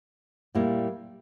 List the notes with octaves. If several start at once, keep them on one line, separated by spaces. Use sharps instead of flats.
A#2 G3 A#3 E4